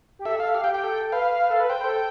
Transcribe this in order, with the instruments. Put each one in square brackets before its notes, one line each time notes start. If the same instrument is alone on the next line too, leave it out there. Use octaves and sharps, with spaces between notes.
[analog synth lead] G4
[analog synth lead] A4 [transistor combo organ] E5
[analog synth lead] A4 [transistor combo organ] F5
[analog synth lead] G4 [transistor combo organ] F5
[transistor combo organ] G5
[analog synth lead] G4
[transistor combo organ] G5
[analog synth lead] A4
[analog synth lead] B4 [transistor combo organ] F5
[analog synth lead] B4
A4
B4
[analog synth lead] C5 [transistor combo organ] G5
[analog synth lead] A4